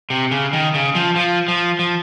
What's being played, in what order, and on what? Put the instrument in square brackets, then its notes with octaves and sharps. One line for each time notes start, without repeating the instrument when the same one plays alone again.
[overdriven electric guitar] C3
C#3
D#3
C#3
F3
F3
F3
F3